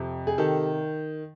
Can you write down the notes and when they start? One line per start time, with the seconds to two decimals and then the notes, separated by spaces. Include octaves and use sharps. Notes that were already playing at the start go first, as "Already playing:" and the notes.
Already playing: F2 C3
0.27 G#4
0.38 D#3 G4 A4